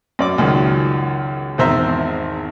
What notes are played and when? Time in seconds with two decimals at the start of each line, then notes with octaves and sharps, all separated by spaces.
0.19 F#2 D5 D6
0.38 C#2 F#2 D#3 F#3
1.58 G#1 E2 D#3 C5 E5 A#5